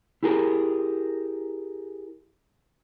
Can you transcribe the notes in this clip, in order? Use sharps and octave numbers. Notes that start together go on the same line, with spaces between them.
E4 G4 G#4 A#4